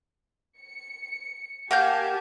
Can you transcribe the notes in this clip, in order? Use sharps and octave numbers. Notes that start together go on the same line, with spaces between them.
C#7
A#3 G4 F5 F#5 G#5 A5 G6